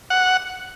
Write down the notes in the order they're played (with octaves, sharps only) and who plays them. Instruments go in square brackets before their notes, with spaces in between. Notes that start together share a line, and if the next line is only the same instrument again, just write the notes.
[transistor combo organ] F#5